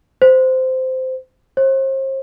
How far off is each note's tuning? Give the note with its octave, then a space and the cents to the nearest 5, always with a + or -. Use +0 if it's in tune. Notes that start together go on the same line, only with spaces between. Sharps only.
C5 -15
C5 +40